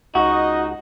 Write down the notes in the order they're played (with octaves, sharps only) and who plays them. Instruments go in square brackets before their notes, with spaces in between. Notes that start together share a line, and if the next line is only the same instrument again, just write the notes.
[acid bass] C#2 [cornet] D#4 [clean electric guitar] F#4 [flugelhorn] D#5